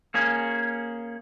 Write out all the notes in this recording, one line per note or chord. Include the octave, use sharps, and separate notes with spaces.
A#3 C#4 G#4